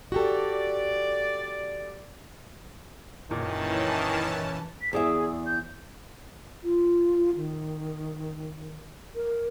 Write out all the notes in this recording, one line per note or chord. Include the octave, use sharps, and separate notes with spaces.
F#4 G4 A4 D5
F#1 A#2 D#3 E3 C#4 A5
B6
E2 G#4 D5 E5
G6
F4
D#3
A#4